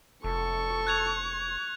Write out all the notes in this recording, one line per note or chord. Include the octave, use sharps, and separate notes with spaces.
F1 A4 C#6
F#6 G#6 F7